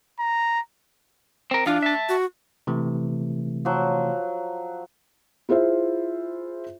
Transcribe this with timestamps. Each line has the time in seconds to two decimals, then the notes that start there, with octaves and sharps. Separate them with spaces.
0.20 A#5
1.51 C4 A#4
1.66 E3 D4 F4
1.82 E5 A5
2.09 F#4
2.67 C3 E3 A3
3.65 F3 F#3
5.49 E4 F4 G#4 C5 E5